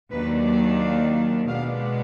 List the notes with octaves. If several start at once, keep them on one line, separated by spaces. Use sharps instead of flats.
D#2 D#3 F#3 D4 B4
D5
F5
B2 G#3 B3 D4 F5